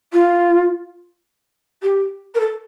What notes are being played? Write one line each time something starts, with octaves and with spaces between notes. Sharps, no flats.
F4
G4
A#4
A4